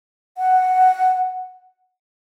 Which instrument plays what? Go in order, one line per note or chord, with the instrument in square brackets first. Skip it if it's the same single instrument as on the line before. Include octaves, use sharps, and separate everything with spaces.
[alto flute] F#5